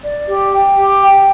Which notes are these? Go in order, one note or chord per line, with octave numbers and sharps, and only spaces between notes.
D5
G4
G5
G4
G5